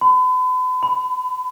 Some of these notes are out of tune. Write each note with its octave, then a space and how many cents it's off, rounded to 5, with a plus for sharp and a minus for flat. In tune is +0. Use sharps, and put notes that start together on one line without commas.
B5 +40
B5 +15